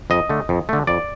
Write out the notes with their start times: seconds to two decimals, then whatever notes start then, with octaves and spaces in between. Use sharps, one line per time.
0.10 F2 D#5
0.29 D3 A3
0.49 F2
0.69 D3 A3
0.87 F2 D5